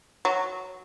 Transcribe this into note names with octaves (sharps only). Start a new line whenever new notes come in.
F#3